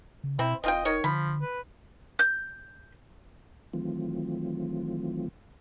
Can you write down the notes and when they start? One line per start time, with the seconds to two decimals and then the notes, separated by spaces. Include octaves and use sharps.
0.24 C#3
0.39 B2 C4 E4
0.64 E1 C4 F4 D#5 G5
0.85 D#3 C#5
1.04 D3 F3 B5
1.42 B4
2.19 G6
3.73 D#3 E3 F#3 A3 C4 F4